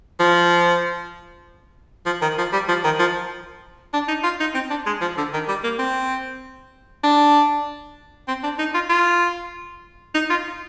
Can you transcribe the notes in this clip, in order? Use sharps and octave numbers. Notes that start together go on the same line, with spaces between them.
F3
F3
D#3
F3
G3
F3
D#3
F3
D4
D#4
F4
D#4
C4
D4
G#3
F3
D3
D#3
G3
A#3
C4
D4
C4
D4
D#4
F4
F4
D#4
F4